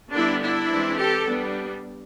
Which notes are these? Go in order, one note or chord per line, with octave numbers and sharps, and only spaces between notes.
D3 G3 B3 D4 E4
D4 E4
E3 G#3 C4
G4 A4
G3 B3 D4